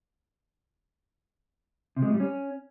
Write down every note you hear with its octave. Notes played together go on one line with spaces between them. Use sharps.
C3
G#3
A2
G3
C#4